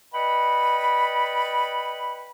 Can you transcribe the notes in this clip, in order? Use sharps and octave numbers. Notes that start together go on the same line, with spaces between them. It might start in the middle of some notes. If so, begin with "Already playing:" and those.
B4 D5 D#5 F#5 G5 B5